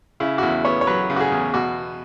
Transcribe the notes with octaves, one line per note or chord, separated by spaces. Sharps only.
C#3 E4
F#4
E2 E4
B3 C#5
C#5
F#3 B4
C#3
F#4
G#4
E2
B2 F#4